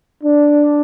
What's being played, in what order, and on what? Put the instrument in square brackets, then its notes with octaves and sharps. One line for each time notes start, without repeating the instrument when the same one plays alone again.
[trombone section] D4